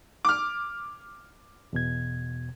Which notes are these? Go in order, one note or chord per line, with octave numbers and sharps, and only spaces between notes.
D6 F6
E2 B2 G#6